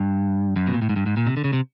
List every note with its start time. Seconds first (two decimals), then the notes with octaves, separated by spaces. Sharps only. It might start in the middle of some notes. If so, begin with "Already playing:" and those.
Already playing: G2
0.56 F#2
0.67 B2
0.74 A#2
0.82 A2
0.89 G#2
0.96 G2
1.06 G#2
1.17 A#2
1.27 C3
1.37 D3
1.44 C#3
1.53 C3